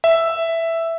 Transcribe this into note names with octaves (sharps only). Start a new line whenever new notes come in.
E5